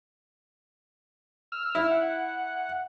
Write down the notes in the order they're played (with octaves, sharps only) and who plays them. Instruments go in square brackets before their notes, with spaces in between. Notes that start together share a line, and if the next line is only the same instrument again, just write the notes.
[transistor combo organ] E6 F6
[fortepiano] E4
[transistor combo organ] F#5